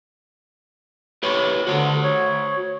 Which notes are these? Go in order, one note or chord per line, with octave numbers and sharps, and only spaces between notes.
G4 B4 C#5
D3 F#4 C5
C#5